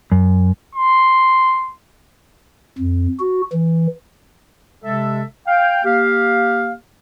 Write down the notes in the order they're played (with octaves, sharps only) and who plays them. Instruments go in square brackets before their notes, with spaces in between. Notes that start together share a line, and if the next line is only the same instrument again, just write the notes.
[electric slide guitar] F#2
[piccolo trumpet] C6
[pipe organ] F2
F#4
E3
[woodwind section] C3 G#3 A4 E5
F5 G5
A#3 G4 F5